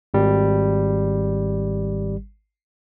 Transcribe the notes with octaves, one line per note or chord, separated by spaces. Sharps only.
G#1 G3